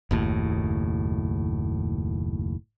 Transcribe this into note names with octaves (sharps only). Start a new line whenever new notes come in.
F#1 D#2 A2